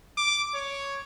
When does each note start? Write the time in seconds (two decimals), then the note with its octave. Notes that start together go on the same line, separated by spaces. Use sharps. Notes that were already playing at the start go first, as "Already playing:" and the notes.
0.17 D6
0.54 C#5